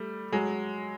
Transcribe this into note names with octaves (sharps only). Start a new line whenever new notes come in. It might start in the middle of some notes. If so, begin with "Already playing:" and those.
Already playing: G3 A3
F#3 G#3